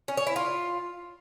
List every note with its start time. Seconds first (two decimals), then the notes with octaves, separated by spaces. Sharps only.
0.08 C#4
0.17 C#5
0.27 E4
0.36 F4